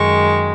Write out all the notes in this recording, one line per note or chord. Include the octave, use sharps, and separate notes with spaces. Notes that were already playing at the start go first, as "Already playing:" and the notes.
Already playing: F#2 D#3 G#3 C#6